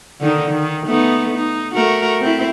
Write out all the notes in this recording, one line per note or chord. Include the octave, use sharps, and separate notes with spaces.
D3 D#3 D#4
D#3
A3 B3 D#4
D#4
A3 F#4 A#4
C4 E4